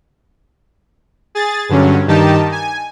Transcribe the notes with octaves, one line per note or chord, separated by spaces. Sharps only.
G#4 A6
G2 D3 F#3 C#4
G2 D#3 D#4 G4 A5
G#5